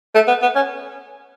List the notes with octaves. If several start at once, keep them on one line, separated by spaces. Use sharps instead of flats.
A3
B3
B3
C#4